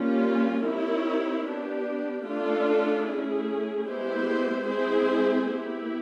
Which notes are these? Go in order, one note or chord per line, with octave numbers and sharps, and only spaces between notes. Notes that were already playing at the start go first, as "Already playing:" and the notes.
Already playing: G3 A#3 C#4 F4
C4 E4 G4 A#4 C#5
B3 D4 G4
A3 D4 F4 A4
A3 C#4 E4 G#4
G#3 B3 E4 G4 C5
G#3 C4 E4 G#4 C5
B3 E4 G4